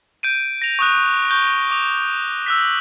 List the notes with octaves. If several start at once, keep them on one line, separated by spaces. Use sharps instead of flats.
G6 D7 D#7
A#6 F7
C#6 D#6 F#6
C#6 G6 G7
D6 F7
E6 F#6 B6